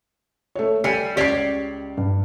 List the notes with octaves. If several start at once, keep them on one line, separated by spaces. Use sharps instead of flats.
A3 C#5
G3 G#5 C7 C#7
C#2 G4 C#5 D5 C7
G2